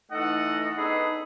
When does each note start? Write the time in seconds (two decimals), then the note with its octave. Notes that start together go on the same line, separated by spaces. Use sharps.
0.12 E3 A3 D#4 A4 D#5 F#5
0.77 B3 D4 D#4 G#4 A4 B4